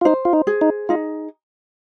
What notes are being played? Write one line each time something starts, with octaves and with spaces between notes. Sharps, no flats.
F4
D#4 C5
F4
D#4
G#4
D#4
D#4 F4